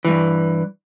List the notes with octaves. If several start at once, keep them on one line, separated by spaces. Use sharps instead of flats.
G2 E3